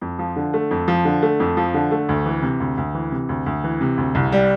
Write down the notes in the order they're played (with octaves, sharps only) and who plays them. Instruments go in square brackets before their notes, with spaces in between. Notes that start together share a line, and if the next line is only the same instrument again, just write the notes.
[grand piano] F2
F3
D3
A3
F2
F3
D3
A3
F2
F3
D3
A3
D2
E3
C3
D2
D2
E3
C3
D2
D2
E3
C3
D2
C2
G3